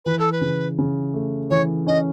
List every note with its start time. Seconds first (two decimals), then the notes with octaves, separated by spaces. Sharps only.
0.05 E3 B4
0.19 A4
0.32 B4
0.41 C#3
0.78 C#3
1.14 A3
1.50 E3 C#5
1.87 C#4 D#5